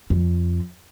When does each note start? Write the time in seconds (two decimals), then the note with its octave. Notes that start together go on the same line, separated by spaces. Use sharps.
0.10 F2